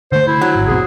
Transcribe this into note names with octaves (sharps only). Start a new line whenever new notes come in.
D3 A3 C5
E4
F#3
G#1
B1 E2 C4 G#4